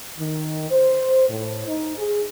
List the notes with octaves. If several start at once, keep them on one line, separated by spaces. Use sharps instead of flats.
D#3
C5
A2
D#4
G#4